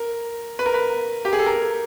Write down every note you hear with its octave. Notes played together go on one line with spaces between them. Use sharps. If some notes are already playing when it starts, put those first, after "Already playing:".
Already playing: A#4
B4
A#4
B4
G4
G#4
A4
A#4